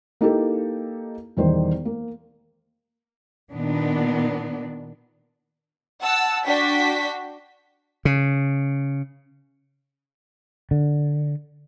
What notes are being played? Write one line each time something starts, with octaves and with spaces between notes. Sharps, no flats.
A#3 D#4 E4 G4 A4
E1 E2 D#3 G3 C5
A#3
A#2 D#3 B3 D4
F#5 A5 E6
D4 F#4 G5 B6
C#3
D3